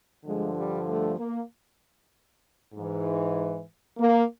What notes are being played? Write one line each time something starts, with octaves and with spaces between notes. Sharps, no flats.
G2 D3 F3 G#3
G3
A3
A#3
G#2 E3
A#3